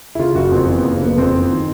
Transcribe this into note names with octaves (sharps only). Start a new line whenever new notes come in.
E4
C#3 F4
F#1 F#4
F2 C4
E3 B3
C#3 A#3
F#1 B3
F2 C4
E3
D#3